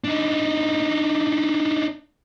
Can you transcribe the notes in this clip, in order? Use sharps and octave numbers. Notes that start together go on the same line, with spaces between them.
D4 D#4